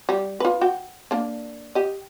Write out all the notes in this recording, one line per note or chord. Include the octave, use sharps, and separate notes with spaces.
G3
F4 B4
F#4 G5
A#3 D4
G4 D#5